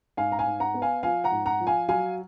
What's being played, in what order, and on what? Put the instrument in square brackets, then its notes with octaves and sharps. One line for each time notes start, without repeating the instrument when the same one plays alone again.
[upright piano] G#2 F5 G#5
A#5
F5 G#5
G#2
F#5 A#5
B3
F5 G#5
F3 F5 G#5
F#5 A#5
G#2
F#5 A#5
F3
F5 G#5
F#3 F5 G#5